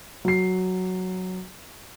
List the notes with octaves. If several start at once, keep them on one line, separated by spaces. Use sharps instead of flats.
F#3 C7